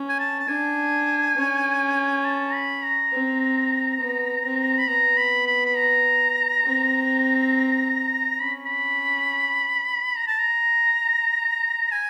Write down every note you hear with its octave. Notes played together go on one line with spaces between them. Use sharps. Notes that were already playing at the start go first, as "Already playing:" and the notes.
Already playing: C#4
G#5
A5
A5
D4 G#5
C#4
A5
B5
A#5
C4
B3
C4
B5
B3 A#5
B5
B5
B5
A#5
C4
C#4 B5
B5
A#5
A5
A#5
G#5